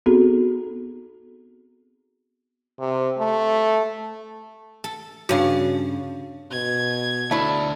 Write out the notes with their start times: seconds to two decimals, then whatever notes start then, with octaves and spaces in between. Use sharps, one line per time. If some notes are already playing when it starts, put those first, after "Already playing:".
0.06 B3 C4 D#4 F#4 G#4 A4
2.80 C3
3.19 A3
4.84 A4
5.29 G2 C#3 F#4 C#5 F5
6.52 B2 G#6
7.31 D2 A3 D4 E4